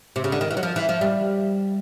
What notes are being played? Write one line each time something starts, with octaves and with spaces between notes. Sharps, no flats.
C3
C#3
D3
D#3
E3
F#3
F3
E3
F3
G3